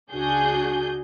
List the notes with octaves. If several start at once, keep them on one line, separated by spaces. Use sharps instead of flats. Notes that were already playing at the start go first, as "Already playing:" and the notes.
C#2 D4 F#4 G#4 G6